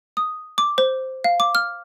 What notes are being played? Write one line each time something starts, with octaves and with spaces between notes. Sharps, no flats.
D#6
D6
C5
F5
D6
F6